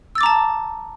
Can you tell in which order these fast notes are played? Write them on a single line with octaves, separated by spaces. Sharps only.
E6 A6 D6 A#5 A5